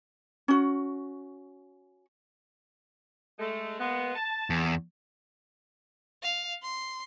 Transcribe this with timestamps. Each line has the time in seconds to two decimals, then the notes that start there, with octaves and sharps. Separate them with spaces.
0.48 C#4 F#4
3.39 G#3 A3
3.78 G#3 A#3 B3
4.14 A5
4.50 E2
6.23 F5
6.63 C6